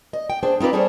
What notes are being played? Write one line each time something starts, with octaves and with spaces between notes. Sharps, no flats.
D#5
G5
D4 G#4 C5
C4 D#4 F4 B4 D5
G3 D4 G#4 A4 C5 C#5